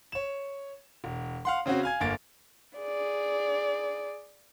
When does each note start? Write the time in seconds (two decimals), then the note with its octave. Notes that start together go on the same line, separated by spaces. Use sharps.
0.12 C#5 E7
1.04 E1
1.45 F5 F#5 C6
1.66 C#3 C4 C#4 F#4
1.83 F5 G#5 G#6
2.00 G1 A#3 A6 D7
2.77 G#4 D5